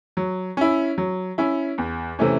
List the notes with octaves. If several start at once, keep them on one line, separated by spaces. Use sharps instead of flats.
F#3
C#4 E4
F#3
C#4 E4
E2
C3 E3 A3 C#4